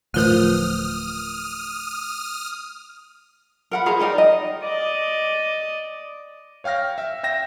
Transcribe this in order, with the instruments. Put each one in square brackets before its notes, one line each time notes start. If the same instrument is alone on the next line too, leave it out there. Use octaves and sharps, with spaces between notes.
[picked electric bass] D1 F3 [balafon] A3 A#4 B4 [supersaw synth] D#6 F6
[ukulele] A#4 F#5 B5
G#4 C5 A#5 B5
D#4 G4 A#4 D5
D#5
[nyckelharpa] D5 D#5
[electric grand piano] C#5 F5 G5 F6 A#6
E5
E5 G5 A#6 E7